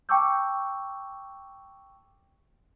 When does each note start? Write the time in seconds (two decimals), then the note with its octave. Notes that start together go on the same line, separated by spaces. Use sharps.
0.09 G5 A5 C#6 D6 E6 G6